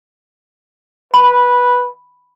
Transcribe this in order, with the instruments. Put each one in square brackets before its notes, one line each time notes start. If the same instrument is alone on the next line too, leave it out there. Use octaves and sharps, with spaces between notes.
[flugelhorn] B4 [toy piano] B5